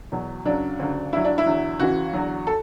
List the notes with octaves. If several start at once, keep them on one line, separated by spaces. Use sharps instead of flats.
E2 B2 F#3
F#2 C#3 F#3 D4
D2 C#3 F#3
G2 F#3 E4
D4
E4
E2 D3 F#3
C#2 C#3 E3 F#4
E2 D3 F#3
A4